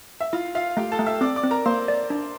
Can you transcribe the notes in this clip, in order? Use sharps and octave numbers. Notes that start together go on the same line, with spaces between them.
E5
E4 F4 F5
F4 E5 F5
A3 G4 G5
A4 A5
A3
E5 E6
C4 D5 D6
D5 D6
C4
A#4 A#5
A#3 C5 C6
D5
D4